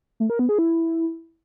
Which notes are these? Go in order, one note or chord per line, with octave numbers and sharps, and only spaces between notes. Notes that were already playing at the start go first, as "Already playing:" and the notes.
A3
A#4
B3
G#4
E4